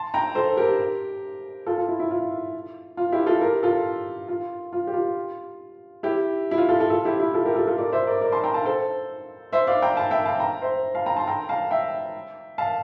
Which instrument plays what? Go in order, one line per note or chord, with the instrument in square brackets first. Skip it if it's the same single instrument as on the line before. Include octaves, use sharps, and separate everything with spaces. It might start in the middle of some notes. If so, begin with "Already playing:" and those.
Already playing: [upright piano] A5 C6
G5 A#5
A4 C5
G4 A#4
F4 A4
F4
E4
E4
F4
F4
E4 G4
F4 A4
G4 A#4
F4 A4
F4
F4
G4
F4
E4 G4
E4
F4
F4 A4
F4 A4
F4 A4
E4 G4
E4
F4 A4
G4 A#4
F4 A4
F4 A4
A#4 D5
C5 E5
A#4 D5
A#4 D5
A5 C6
G5 A#5
F5 A5
A4 C5
C5 E5
D5 F5
G5 A#5
F5 A5
E5 G5
F5 A5
G5 A#5
C5 E5
F5 A5
G5 A#5
A5 C6
G5 A#5
F5 A5
E5 G5
F5 A5